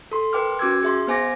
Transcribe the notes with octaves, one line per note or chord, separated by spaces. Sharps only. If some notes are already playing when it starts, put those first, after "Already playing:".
A4 C6
A#4 B4 G5 C6 D6 F6
C#4 F#4 D6 E6 G#6
G#4 E5 C6
B3 C5 G#5 D6 A#6